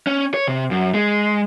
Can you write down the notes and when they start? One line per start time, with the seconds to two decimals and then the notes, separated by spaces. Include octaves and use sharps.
0.07 C#4
0.34 C#5
0.48 C3
0.71 F#2
0.94 G#3